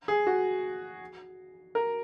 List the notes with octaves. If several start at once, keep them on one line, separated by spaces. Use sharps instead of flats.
G#4
F#4
A#4